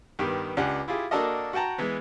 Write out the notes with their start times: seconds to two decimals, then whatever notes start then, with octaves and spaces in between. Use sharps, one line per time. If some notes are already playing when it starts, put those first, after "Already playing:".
0.19 G2 D#3 B3 G4
0.57 C#2 D4 G4 F#5 G#5
0.88 E4 F4 G4 G#4
1.11 A#3 D4 F#4 A4 A#4 D#5
1.53 F#4 F#5 G5 A5 A#5
1.78 E3 G#3 B3